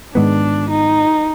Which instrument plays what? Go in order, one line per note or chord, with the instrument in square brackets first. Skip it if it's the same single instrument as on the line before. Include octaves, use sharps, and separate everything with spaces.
[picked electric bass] G#2 D#3 G#3 B3 [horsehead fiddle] D4
[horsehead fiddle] D#4